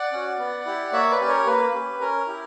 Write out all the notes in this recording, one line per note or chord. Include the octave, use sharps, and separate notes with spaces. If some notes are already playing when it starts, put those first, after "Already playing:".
Already playing: D5 F#5
C#4 F#4
B3
E4 G4
A#3 C#5 E5
B4 D5
C#4 G4
A#4 C#5
A#3 B4
C#4 G4
C#4 A#4
E4 G4